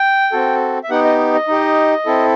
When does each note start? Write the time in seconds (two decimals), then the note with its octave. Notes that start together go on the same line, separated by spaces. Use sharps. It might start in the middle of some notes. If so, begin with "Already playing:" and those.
Already playing: G5
0.32 C4 F#4 A4
0.84 E5
0.90 B3 D#4 G4 F#5
1.04 D#5
1.34 D#5
1.48 D#4 G4
2.06 C4 E4 A4